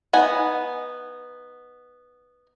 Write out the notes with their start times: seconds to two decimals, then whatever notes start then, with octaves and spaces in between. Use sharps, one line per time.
0.13 B3 D#4 F#5 G#5